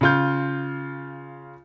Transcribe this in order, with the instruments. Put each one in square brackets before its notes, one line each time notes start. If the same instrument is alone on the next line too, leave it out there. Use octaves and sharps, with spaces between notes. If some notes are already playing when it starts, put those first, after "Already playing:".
[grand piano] C#3 F4 G6